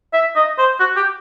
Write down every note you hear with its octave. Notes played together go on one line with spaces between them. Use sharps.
E5
D#5
C5
F#4
G4